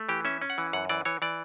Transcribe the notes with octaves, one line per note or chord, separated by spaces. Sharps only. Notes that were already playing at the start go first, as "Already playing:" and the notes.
Already playing: A3
E3 G4
C#4 E5
C#4
F#5
E3
F#2 F#5
E3 D5
E3 C#5
E3 D5